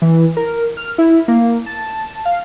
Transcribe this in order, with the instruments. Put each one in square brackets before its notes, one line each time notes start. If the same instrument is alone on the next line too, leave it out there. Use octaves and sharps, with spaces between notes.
[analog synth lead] E3
A#4
F6
E4
A#3
A5
F5